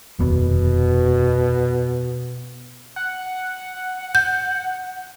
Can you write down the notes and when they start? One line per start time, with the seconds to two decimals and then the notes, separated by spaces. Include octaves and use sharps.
0.19 F1 D#2 B2 B3
2.96 F#5
4.15 G6